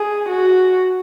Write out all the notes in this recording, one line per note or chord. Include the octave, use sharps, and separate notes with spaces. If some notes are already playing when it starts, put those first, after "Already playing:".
Already playing: G#4
F#4